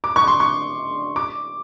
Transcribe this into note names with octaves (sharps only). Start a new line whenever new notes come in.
D6
C#6
C6
C#6
D6